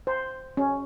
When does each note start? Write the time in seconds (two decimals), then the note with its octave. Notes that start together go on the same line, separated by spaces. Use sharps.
0.07 C5
0.57 C#4